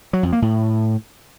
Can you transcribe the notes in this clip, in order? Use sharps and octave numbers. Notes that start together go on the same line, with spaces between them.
F#3
F2
A#3
A2